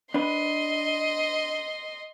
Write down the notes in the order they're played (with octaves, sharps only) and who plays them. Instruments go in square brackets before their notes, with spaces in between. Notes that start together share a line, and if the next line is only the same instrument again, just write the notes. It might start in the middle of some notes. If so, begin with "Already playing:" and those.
[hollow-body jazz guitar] D4 B4 [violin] D#5 C6